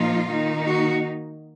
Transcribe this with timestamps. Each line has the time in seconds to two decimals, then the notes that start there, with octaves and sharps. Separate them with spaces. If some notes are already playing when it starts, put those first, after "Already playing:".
Already playing: A#2 F3 A#3 D#4 F4
0.28 D#3 A#3 D#4
0.66 F#4